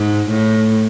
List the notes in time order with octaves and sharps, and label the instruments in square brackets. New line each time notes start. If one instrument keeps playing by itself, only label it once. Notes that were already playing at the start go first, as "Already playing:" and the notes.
Already playing: [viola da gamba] G#2
A2